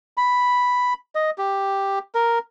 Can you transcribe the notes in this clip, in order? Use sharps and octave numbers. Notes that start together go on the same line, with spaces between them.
B5
D#5
G4
A#4